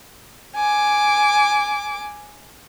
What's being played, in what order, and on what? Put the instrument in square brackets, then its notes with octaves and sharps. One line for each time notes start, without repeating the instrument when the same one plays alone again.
[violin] G#5 D6